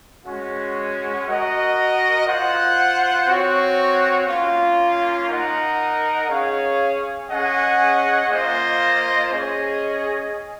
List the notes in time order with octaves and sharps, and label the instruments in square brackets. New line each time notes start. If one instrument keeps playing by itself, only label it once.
[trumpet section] G#3 C#4 F#4
F#4 A#4 D#5 F#5
F4 C5 F#5
C4 F#4 C#5
A#3 C#4 F4
D#4 A#4 D#5 F#5
C#4 G#4 C#5 F5
C#4 G#4 D#5 F#5
A#3 F4 C5 D#5
C#4 G#4 D#5